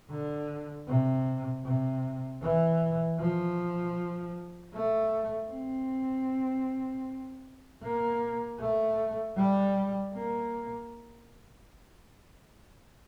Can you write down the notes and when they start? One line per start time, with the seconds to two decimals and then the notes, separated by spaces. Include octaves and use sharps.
0.10 D3
0.87 C3
1.65 C3
2.42 E3
3.19 F3
4.73 A3
5.51 C4
7.82 A#3
8.59 A3
9.37 G3
10.14 A#3